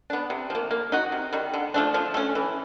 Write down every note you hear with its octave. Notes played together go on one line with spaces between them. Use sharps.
B3 D4
C3
F3 A#3
A#3
D#4 F#4
C3
D#3 G3
D3
F3 A3 D4
F3
A3 C#4
E3